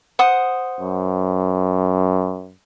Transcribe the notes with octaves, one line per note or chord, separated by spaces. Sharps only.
C5 F#5 D#6
F#2